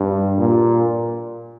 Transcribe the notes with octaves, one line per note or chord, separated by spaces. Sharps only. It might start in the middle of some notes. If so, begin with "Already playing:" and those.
Already playing: G2
A#2